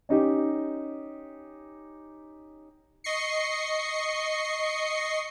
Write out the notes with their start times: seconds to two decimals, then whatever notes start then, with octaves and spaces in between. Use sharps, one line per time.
0.09 C#4 D#4 G4
3.04 D#5 C#6 C7 C#7